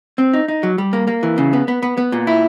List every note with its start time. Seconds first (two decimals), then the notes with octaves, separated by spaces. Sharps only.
0.18 C4
0.33 D#4
0.48 D#4
0.63 F#3
0.78 G3
0.93 A#3
1.07 A#3
1.23 E3
1.38 C#3
1.53 B3
1.68 B3
1.83 B3
1.98 B3
2.12 A#2
2.27 E4